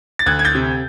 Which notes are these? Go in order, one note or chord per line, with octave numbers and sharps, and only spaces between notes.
A6
D2 F#6 G#6
G#6
G6 A6
C3